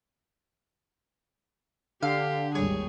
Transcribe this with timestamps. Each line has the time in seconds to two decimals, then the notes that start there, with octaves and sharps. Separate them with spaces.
2.02 D3 G4 F5
2.55 G#1 D#2 G3 G#4 C#5